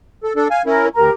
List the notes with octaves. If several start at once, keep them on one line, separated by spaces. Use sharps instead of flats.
A4
D4 A4
F5 G#5
C#4 E4 A#4
D2 G4 A#4 A#5